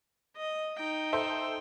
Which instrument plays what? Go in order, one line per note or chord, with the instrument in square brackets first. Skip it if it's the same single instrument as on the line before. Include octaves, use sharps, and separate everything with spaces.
[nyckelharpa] D#5
D#4 G5
[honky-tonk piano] A4 C5 E5